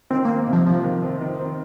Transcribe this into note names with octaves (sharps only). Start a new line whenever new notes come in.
D#3 C4
A#3
C4
C3
F3
F3 F4
D#3
C4
D#3
C4